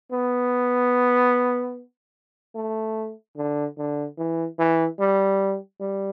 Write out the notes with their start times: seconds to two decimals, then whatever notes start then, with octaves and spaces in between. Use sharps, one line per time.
0.12 B3
2.56 A3
3.37 D3
3.78 D3
4.18 E3
4.59 E3
5.00 G3
5.81 G3